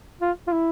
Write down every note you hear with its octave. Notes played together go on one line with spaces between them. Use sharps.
F4
F4
E4